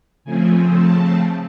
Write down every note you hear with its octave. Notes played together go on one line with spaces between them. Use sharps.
C#3 F3 A3 C4 G#5
A5